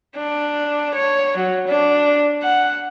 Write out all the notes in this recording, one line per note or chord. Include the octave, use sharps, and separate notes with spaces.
D4
C#5
F#3
D4
F#5